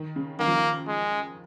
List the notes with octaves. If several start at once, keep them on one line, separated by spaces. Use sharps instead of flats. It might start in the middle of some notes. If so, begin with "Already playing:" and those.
Already playing: D#3
C#3
D#3 A#3
F3
D#3
G#3